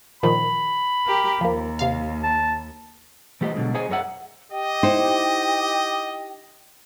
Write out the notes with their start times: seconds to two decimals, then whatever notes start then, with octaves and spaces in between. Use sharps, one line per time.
0.23 A#2 D#3 F3 B5
1.06 G4 A#4
1.41 D#2 F3 A#3
1.79 C3 F5
2.23 A5
3.41 E3 A3 G4 C5 D#5
3.54 B2 D3 F#3 G#3
3.74 G#4 C5 C#5 D#5 G#5
3.89 F#2 G#4 A#4 C#5 E5 F#5
4.52 G4 D#5 G5
4.83 D#4 E4 C5